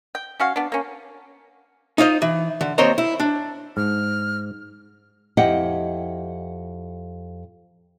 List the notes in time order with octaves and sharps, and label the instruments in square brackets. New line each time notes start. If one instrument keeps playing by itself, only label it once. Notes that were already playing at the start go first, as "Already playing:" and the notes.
[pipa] G5
C#4 F#4 F5
B3 D4
A#3 C#4
[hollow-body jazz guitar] D#4 F4 C5 D#5
E3
D3
D#2 C4 C5 C#5 D#5 A#5
E4
D4
[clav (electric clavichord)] G#2 [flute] F6
[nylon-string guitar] F2 E4 G4 D#5 F#5 G5